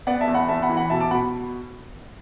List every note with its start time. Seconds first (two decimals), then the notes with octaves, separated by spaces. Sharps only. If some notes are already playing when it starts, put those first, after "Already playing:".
0.07 B3 D5 F#5
0.21 E5 A5
0.27 E2
0.34 F#5 B5
0.48 E2 E5 A5
0.62 F#5 B5
0.69 E3
0.77 F#5 B5
0.90 B2 E5 A5
1.00 A5 D6
1.11 B2 F#5 B5